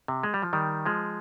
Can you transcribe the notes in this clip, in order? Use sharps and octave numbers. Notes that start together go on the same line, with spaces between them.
C3
G#3
G3
F3
D#3 G3
F3 G#3